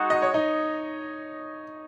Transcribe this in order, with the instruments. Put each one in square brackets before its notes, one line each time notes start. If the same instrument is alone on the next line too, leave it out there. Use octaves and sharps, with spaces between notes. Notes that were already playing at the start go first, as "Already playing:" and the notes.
Already playing: [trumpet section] G#3 D#4 F#4
[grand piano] D#5
C#5
D#4 D#5